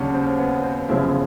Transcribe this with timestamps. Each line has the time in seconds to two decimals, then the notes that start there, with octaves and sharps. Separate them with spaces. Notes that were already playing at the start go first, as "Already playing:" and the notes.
Already playing: D#2 C#3 F#3 C#4 D4
0.14 C4
0.38 B3
0.63 C4
0.89 G1 F#2 C#3 F3 E4